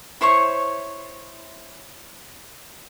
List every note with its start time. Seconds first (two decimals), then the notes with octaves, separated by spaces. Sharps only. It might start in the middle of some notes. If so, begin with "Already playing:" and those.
0.21 E4 C5 C#5 C#6